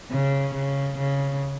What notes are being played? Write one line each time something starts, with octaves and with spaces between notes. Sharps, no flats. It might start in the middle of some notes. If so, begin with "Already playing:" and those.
C#3
C#3
C#3